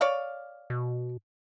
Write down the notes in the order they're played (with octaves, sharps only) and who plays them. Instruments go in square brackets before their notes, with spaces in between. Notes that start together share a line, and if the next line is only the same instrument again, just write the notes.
[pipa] C#5 D5 F5
[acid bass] B2